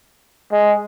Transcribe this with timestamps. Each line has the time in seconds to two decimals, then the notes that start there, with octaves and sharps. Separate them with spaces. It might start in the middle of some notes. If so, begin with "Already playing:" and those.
0.52 G#3